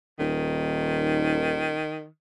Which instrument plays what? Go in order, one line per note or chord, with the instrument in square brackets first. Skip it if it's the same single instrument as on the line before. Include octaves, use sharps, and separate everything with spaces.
[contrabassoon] D#1 [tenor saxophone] D#3